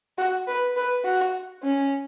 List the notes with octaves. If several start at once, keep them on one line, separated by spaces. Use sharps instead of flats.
F#4
B4
B4
F#4
C#4